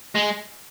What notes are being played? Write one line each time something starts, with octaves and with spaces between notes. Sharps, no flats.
G#3